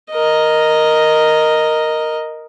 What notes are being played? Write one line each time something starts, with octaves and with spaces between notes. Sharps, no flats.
A#4 D#5